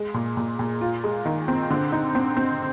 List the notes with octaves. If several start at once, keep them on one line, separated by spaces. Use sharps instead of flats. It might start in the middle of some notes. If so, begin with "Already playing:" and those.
Already playing: G#3
A#2
A#2
A#2
F4
G#3
D#3
C4
D3
D#4
C4
C4